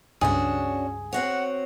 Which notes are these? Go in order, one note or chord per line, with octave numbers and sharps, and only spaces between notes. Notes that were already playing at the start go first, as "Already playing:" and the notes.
C#2 G2 C#4 D4 F#4 G#4
C4 F#4 C#5 F#5